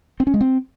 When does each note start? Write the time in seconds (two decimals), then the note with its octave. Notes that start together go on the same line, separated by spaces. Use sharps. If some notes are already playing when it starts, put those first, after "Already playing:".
0.20 C4
0.27 C#4
0.34 G#3
0.41 C4